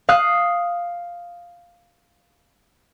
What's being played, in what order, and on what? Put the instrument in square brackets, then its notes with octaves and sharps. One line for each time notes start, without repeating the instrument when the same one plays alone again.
[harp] F5 D#6 F#6